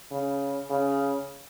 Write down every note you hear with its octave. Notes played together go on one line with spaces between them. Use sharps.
C#3
C#3